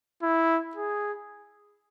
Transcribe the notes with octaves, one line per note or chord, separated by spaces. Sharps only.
E4
G#4